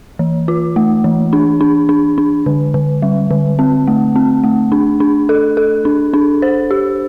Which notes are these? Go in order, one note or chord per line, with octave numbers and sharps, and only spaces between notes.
E3
F4
A3
E3
D4
D4
D4
D4
D3
D3
G3
D3
C4
A3
C4
A3
D4
D4
A4
A4
D4
D4
C5
G4